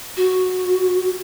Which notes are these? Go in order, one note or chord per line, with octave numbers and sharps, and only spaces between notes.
F#4